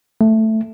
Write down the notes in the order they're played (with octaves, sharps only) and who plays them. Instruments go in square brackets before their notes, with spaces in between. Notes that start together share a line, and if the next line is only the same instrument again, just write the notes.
[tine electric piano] A3